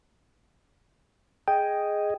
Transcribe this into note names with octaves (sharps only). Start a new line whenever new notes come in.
G#4 D#5 G5